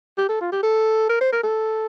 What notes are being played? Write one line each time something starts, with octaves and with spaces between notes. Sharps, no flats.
G4
A4
F4
G4
A4
A#4
C5
A#4
A4